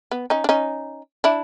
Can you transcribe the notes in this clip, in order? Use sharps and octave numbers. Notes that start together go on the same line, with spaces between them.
B3
C#4 D#4
D4
C#4 D#4
D4 E4